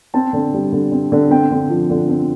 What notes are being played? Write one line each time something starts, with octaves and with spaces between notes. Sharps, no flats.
C4 A5
D3
G3
D3
C4
D3
C4 G5
D3
F3
D3
C4